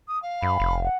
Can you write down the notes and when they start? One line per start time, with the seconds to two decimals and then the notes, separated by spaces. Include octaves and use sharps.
0.08 D#6
0.23 F5
0.43 F#2 B5
0.60 F1
0.83 F#5